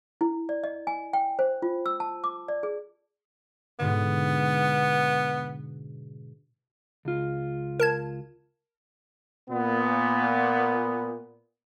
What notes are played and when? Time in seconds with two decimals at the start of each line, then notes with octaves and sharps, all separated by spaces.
0.21 E4
0.49 D5
0.64 D#5
0.87 G#5
1.13 G5
1.39 C5
1.62 F4
1.86 E6
2.00 A5
2.24 D6
2.48 D5
2.63 G#4
3.79 G#2 B2 D3 B3
7.05 C#2 F4
7.80 A#4 A5 G#6
9.50 A#2 B3